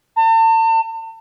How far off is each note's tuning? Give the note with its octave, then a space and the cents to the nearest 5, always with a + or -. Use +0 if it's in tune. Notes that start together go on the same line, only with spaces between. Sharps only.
A5 +40